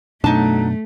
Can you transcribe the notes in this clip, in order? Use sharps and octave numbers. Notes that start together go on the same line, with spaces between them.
F#2 B2 F#3 A3 D4 D#4 A5